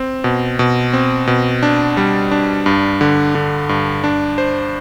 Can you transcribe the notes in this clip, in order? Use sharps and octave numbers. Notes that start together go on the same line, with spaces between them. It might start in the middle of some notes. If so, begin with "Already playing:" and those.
Already playing: C4
B2
B2
C4
B2
D4
G3
D4
G2
D3
D3
G2
D4
C5